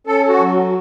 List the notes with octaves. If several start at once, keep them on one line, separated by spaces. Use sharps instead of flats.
C#4 A4
F#4
F#3